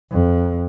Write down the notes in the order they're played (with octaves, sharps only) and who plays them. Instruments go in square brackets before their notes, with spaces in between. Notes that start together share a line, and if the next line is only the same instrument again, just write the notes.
[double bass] F2